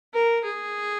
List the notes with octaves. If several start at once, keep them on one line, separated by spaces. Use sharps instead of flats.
A#4
G#4